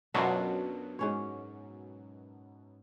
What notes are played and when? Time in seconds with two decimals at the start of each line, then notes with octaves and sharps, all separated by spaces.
0.14 F#2 B2 F#3 D4 F4
0.99 G#2 C#4 C#5